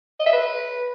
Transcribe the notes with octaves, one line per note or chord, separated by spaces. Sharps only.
D#5
E5
B4